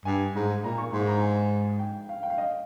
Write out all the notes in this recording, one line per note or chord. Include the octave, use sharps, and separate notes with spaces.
G2 G#5
G#2 A#5
A#2 A#5
C#6
G#2 C6
A#5
G#5
G5
F5
G5
F5
D#5